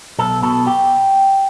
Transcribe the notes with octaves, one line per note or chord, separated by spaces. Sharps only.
B1 A4
B2 A4
G4